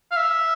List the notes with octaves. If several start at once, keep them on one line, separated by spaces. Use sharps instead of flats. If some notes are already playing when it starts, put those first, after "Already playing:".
F5
E5